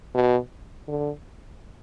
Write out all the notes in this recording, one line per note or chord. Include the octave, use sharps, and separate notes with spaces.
B2
D3